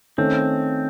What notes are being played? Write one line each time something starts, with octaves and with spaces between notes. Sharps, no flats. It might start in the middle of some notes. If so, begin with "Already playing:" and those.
D#3 A3 C4 C#4